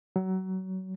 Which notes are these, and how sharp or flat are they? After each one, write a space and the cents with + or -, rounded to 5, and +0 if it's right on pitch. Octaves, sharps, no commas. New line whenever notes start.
F#3 +25